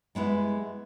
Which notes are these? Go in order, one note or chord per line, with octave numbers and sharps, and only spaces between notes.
G3 G#3 B3 E4